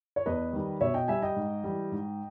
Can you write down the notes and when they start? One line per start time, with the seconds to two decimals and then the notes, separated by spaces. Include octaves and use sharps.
0.16 C#5
0.26 E2 B4 D#5
0.53 D#3 G3
0.81 B2 C#5 E5
0.94 D#5 G5
1.08 G3 E5 G#5
1.22 D#5 G5
1.36 G#2
1.64 E3 G3
1.92 G#2